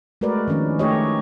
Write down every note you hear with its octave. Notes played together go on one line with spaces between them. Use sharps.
G#3 A3 F#4 A#4 B4 D5
D#3 F3 C#4 D4
A3 D#4 G4 C#5 D#5